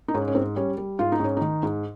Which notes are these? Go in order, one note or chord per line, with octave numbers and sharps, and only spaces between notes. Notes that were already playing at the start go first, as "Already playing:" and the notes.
D#4
G#2 C#4
C#4
G#2 C4
G3 C#4
G3
G#2 F4
D#4
G#2 C#4
D#3 D#4
G#2